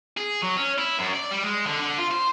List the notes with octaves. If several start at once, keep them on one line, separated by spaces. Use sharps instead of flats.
G#4
F#3
C#4
E4
F#2
D5
G3
G#3
D3
D3
F4
C5